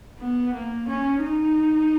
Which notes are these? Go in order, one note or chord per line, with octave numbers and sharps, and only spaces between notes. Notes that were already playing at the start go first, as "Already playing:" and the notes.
B3
A#3
C#4
D#4